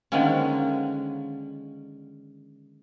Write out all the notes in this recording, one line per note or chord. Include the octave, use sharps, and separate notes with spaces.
D3 D#3 F3 G#3 A#3 C#4